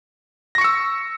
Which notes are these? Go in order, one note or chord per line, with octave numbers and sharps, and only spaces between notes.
C#6 E6 A#6 C#7